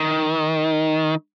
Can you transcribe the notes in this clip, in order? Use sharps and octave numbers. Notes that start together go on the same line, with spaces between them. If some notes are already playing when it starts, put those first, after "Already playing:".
Already playing: D#3